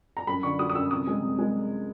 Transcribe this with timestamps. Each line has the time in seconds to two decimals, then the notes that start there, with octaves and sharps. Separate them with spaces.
0.17 A#5
0.27 F#2 B5
0.43 D3 C#6
0.59 F#3 D#6
0.70 D#6
0.75 F#2 E6
0.91 C3 D#6
1.07 G#3
1.23 C3
1.38 G#3